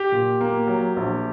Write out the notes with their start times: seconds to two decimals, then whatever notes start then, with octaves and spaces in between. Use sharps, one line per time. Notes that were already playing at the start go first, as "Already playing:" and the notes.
Already playing: G4
0.12 A#2
0.41 A#3
0.67 F#3
0.97 A#1